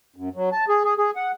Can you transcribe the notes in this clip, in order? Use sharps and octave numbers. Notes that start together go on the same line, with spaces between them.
F#2
F#3
A5
G#4
G#4
G#4
F#5